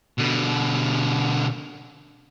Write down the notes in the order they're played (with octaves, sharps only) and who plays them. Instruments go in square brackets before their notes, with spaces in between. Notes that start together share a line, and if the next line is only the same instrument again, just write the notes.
[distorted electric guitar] B2 D3